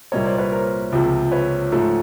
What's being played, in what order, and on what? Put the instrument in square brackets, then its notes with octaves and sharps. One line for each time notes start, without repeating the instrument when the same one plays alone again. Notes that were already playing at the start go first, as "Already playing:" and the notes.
[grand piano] C2 A#2 G3 A#3 C#5 D#5
C5 D5
B4 C#5
A#4 C5
C#2 C3 F3
B4 C#5
G#2 F3 A3